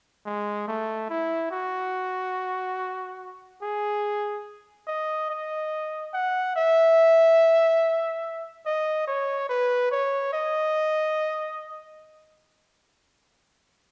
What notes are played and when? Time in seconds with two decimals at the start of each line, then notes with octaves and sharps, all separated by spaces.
0.26 G#3
0.68 A3
1.10 E4
1.51 F#4
3.62 G#4
4.87 D#5
5.30 D#5
6.14 F#5
6.56 E5
8.66 D#5
9.07 C#5
9.49 B4
9.92 C#5
10.33 D#5